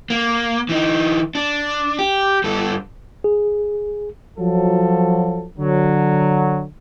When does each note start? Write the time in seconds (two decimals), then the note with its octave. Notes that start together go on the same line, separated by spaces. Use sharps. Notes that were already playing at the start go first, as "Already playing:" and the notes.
0.10 A#3
0.69 E3 D#4
1.35 D4
1.99 G4
2.44 G2 A4
3.24 G#4
4.38 F3 F#3 A4
5.58 D3 F#3